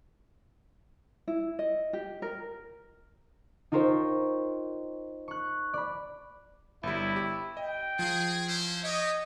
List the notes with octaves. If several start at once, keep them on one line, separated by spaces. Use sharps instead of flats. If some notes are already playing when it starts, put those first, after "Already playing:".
E4
D#5
G4
A#4
D#4 F4 A#4 C5 C#5 G5
C#6 F#6
D5 B5
G1 G3 E4
G4
D#5 G5
F3 G#4
C#4 E4 C5
G4 C#5 D#5